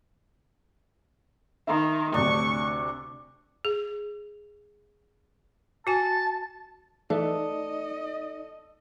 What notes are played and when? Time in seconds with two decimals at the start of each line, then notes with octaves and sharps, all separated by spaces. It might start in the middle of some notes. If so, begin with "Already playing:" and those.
1.67 D#3 E5 A#5 C6
2.14 D2 C3 D4 C#6
3.65 G#4
5.87 F#4 G#5 A5
7.10 E3 A3 D#4 A4 D5 D#5